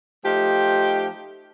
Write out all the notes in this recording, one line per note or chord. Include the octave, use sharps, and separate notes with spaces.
F3 A3 D#4 G4